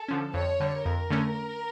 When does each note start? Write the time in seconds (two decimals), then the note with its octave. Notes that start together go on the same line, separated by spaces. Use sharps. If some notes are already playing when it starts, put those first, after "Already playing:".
Already playing: A4
0.08 D3 F3 C#4
0.34 F2 C#5
0.60 D3 G3
0.85 F2 A#4
1.10 D3 A3 C#4